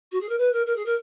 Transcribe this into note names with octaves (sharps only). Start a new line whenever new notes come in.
F#4
G#4
A#4
B4
A#4
A#4
G#4
A#4